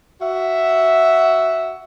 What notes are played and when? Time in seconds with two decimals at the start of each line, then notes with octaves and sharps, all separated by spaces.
0.21 F#4 E5